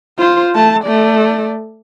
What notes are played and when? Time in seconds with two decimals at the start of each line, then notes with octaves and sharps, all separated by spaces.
0.18 F4 C5
0.55 A3 A5
0.84 A3 D5